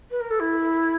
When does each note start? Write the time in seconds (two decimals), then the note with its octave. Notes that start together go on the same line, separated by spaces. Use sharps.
0.10 B4
0.20 A#4
0.30 A4
0.39 E4